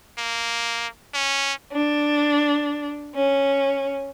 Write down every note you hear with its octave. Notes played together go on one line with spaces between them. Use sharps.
A#3
C#4
D4
C#4